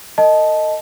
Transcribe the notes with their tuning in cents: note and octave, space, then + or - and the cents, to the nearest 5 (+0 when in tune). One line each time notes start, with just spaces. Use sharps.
A#4 -45 D#5 +0 A5 -15